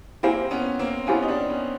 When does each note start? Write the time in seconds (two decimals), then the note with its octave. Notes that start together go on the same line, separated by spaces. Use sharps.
0.23 A#3 C4 E4 G4 C5 F5 G#5
0.51 B3 C#4
0.79 A#3 C4
1.07 B3 C#4 E4 G4 C5 F5 G#5
1.22 D#4
1.28 C4 D4
1.49 B3 C#4